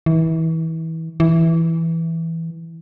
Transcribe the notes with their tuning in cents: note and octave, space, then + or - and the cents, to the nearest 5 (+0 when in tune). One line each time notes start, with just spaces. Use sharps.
E3 -30
E3 -5